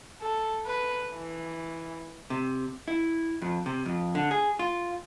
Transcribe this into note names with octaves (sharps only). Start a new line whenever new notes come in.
A4
B4
E3
C3
E4
F2
C3
F2
D3
G#4
F4